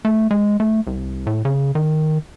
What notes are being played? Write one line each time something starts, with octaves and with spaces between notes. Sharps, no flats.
A3
G#3
A3
C2
A2
C#3
D#3